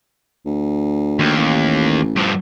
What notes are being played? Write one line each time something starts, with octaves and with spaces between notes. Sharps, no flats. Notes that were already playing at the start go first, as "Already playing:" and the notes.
D2
D#2
A1
G2 F3